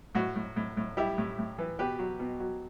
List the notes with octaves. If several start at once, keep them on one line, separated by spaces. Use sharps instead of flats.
A2 F#4
A2
A2
A2
G3 E4 G4
A2
A2
E3
B2 G4 B4
F#3
B2
F#3